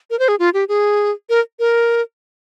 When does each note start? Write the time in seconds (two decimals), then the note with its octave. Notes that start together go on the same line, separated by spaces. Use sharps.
0.10 A#4
0.19 C5
0.28 G#4
0.39 F4
0.54 G4
0.69 G#4
1.29 A#4
1.59 A#4